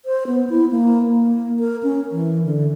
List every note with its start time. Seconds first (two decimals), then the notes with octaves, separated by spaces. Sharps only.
0.05 C5
0.27 B3
0.50 E4
0.71 A#3
1.10 A#3
1.60 A#4
1.83 C#4
2.11 E3
2.44 D3